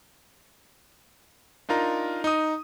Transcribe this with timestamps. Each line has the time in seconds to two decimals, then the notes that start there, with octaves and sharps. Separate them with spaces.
1.69 D4 D#4 F4 A#4 A#5
2.24 D#4 D#6